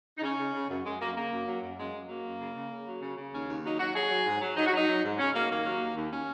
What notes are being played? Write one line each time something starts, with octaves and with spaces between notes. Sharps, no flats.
D#4
C#3 C#4
C#3
C#3
F#2
F#2 G#3
F#2 A#3
C#3 A#3
F#2
F#3
F#2
F#2 G#3
F#2
F#3 A#3
F#2
C#3
C#3
C#3
F#3
C#3
C#3
D#2 C#4
D#2
F#3 D#4
F#3 F#4
F#3 G#4
F#3
G#2
F#3
F#3 D#4
F#4
F#3 D#4
F#3
G#2
C#3 C#4
F#3 A#3
D#2 A#3
F#3
D#2
D#2
C#4